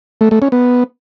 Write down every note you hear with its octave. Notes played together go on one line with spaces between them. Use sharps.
A3
A3
C#4
B3